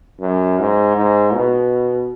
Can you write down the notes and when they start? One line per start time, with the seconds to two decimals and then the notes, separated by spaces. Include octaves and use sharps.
0.20 F#2
0.59 G#2
0.97 G#2
1.34 B2